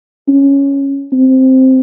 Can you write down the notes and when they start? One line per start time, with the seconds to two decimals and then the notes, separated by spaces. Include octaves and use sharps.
0.28 C#4
1.12 C4